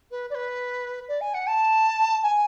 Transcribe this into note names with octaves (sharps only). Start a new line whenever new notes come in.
B4
D5
B4
D5
G#5
F#5
A5
G#5